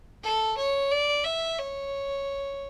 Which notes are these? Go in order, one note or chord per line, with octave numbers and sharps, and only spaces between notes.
A4
C#5
D5
E5
C#5